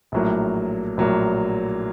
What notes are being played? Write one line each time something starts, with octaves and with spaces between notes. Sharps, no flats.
A#1 A2 F#3 A#3
A#1 A2 F#3 A#3